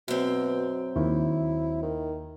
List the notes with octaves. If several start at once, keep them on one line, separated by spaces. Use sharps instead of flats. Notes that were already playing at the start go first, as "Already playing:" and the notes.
F#2 B2 C4
D#2 E4
D#3